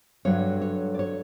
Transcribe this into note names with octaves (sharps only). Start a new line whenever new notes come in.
G2 D3 F#3 C#5
C#5
D5
C#5